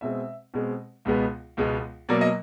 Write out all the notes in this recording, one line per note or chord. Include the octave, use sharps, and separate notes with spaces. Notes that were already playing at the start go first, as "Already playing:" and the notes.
B2 G#3 C4 E5
B2 G#3 C4
C#2 B2 G#3 B3
C#2 B2 G#3 B3
B2 F#3 A#3 D5
D#5